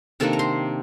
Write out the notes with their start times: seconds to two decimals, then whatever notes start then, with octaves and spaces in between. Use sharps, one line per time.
0.20 C3 D#3 A#3 D4 A4 A5
0.33 A#5
0.39 C5 C6